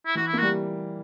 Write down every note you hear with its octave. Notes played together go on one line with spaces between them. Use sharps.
E4
E3 F#4
E4
A#3
G3 F#4